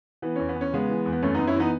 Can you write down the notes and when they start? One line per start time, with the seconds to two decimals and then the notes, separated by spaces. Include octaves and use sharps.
0.22 E3 B3
0.36 E2 C#4
0.49 B3
0.56 E2 C#4
0.73 C#3 G#3 B3
0.89 E3
1.06 E2
1.12 B3
1.22 F#2 A3 C#4
1.34 B3 D#4
1.39 F#2
1.47 C#4 E4
1.56 E3 B3 D#4